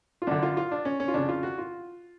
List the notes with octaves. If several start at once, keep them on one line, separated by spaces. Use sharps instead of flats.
F4
F#2 D3 D4
F4
F4
D4
C#4
C#4
F4
F2 C#3 D4
F4
F#4
F4